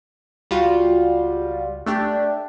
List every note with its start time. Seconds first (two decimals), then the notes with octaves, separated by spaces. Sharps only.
0.51 C#2 G3 F4 F#4
1.86 A3 D4 G4